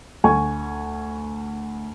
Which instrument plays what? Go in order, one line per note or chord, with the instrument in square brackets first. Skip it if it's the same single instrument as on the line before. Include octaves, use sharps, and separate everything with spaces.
[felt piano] D2 G#5 C#6